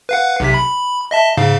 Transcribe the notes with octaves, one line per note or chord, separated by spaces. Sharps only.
B4 F5 F#5
B1 C3 B6
B5
D#5 E5 A5
G#2 C#3 F5